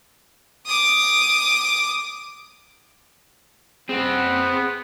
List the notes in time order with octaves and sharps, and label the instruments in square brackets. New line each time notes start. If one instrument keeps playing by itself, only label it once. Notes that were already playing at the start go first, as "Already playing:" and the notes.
[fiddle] D6 D#6
[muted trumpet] B3 [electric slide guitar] C4 [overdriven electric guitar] G#4 F#5